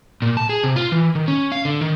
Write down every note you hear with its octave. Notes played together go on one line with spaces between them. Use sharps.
A#2
A5
G#4
C3
F4
E3
D#3
C#4
F5
D3
D#3